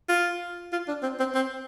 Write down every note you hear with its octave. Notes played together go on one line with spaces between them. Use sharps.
F4
F4
D4
C4
C4
C4